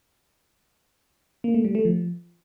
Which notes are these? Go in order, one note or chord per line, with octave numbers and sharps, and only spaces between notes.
A#3
A3
G3
A3
F3